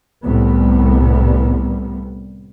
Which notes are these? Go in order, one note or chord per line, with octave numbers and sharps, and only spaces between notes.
C2 A2 G3 B3